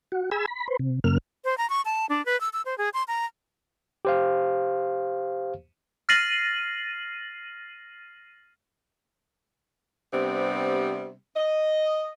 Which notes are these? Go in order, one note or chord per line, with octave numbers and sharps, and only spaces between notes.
F#4
G#4 G#5 B5 E6
B5
B4 C5
C3
F#2 C#3 A#3 F6
C5
A#5
C#6
A5
D4
B4
E6
E6
C5
G#4
C6
A#5
G4 C5 F5
F6 A6 A#6 C7 D#7 F#7
C3 G3 B3 C4 D4
D#5